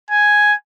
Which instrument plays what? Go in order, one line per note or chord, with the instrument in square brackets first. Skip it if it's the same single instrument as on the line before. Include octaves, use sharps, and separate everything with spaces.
[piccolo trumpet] G#5